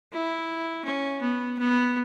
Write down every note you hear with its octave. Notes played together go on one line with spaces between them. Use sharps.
E4
C#4
B3
B3